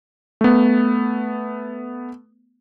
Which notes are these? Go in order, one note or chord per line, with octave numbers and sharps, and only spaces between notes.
A3 B3